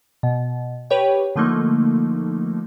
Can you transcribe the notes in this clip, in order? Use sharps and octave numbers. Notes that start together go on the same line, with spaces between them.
B2
G4 B4 C#5 G5
D3 F3 A3 A#3 D#4